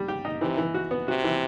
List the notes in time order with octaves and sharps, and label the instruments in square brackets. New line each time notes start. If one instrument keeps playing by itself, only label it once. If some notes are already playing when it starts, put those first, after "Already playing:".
Already playing: [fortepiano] G3
G4
D#4
[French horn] C3 [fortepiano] E3
[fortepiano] E3
F#4
B3
[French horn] C3 [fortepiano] F#4
[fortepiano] E3